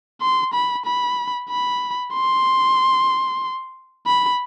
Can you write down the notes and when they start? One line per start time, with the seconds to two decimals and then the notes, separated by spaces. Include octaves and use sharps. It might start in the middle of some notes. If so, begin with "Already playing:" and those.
0.22 C6
0.54 B5
0.86 B5
1.50 B5
2.14 C6
4.07 B5